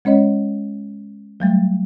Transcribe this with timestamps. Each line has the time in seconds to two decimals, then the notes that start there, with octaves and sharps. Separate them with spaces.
0.05 G#3 C#4 C#5 D#5
1.40 F#3 G3 A3